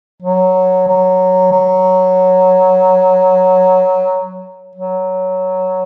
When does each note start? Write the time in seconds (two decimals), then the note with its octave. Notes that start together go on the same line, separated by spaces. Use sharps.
0.22 F#3
0.87 F#3
1.52 F#3
4.75 F#3